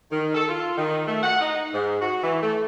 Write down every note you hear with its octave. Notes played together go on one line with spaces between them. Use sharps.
D#3
A4
F4
D#3
A3
F#5
D#4
G#2
F#4
E3
A3